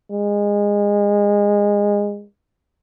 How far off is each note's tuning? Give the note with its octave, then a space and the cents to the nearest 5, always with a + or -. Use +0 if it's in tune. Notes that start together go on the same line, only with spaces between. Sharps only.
G#3 -20